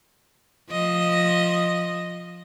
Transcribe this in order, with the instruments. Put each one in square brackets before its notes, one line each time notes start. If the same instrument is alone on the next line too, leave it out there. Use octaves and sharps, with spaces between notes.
[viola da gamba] F3 D#5